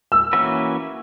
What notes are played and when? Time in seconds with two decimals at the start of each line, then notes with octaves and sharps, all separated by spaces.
0.12 E6
0.33 E3 A#3 C#4 F#4 B4